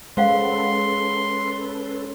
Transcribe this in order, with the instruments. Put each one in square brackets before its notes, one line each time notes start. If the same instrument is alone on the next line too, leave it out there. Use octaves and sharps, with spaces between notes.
[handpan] G#3 [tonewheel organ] C#4 A4 B4 [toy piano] C5 F5 F#5 [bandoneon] C6